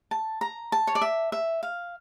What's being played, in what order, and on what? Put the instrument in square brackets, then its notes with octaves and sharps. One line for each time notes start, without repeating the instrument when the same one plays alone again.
[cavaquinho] A5
A#5
A5
C#5
D5
E5
E5
F5